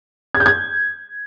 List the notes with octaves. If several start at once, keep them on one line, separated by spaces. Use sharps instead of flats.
G#6
G6
G#6